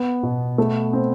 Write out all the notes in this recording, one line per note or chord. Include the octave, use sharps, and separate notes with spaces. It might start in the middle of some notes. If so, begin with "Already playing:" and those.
Already playing: B3
B2
A3
C4